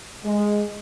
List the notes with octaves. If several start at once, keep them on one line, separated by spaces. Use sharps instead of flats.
G#3